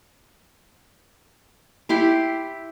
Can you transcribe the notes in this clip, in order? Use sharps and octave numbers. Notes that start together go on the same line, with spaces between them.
E4 G4 C6